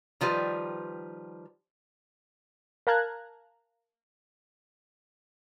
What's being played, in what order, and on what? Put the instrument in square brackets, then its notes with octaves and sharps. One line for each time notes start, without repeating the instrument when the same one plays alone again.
[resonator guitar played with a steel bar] D#3 F3 G3 B4
[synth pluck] A#4 F5 A5 A#5 F#6 G#6